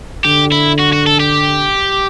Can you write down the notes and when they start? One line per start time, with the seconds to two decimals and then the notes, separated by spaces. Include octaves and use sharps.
0.25 D3 G4
0.52 E4
0.79 F#4
0.93 F#4
1.07 A4
1.20 G4